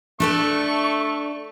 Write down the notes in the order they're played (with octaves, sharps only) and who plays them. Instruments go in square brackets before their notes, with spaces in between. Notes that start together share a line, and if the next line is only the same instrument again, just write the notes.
[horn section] A3 [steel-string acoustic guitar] D4 A4 D5 [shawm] C#6